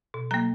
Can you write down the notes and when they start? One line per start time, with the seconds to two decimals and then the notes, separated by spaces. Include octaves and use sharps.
0.14 B2
0.31 F#3 A#3 A#5